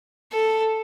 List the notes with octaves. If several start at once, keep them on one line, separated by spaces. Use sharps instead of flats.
A4